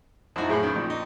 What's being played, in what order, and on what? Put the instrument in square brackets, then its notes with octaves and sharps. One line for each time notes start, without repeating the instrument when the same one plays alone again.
[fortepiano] F#2 F#4 [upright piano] F3 D#4 E4
[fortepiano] F#2 A2 B5 [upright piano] G#4
[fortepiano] D#3 [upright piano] C#4
[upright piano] A#1
[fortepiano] D#4